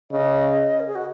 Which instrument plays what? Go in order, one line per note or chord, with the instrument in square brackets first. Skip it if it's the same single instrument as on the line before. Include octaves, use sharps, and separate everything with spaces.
[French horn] C#3 [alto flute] D#5
[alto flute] A#4
G#4
F#4